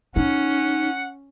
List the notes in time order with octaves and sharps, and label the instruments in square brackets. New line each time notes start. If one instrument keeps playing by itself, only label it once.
[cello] C#4 [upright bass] D#4 [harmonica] F#5